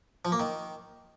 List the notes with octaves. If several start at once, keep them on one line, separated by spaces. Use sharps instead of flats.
F3
A#3
D#3